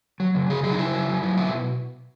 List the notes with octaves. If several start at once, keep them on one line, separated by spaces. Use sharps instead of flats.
F#3
C#3
C#3 G#4
F#3 G#4
D#4
C#3 E4
F#3
F#3
F#3
B2 E4